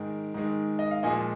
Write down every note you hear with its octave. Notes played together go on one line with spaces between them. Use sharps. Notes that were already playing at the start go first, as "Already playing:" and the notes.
Already playing: G#2 D#3 G#3
G#2 D#3 G#3
D#5
F5
A#2 F3 G#3 D#5 G#5